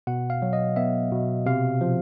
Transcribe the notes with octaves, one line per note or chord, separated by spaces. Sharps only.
B2 F#5
F5
F#3
D#5
B3 E5
B2
C3 F5
F3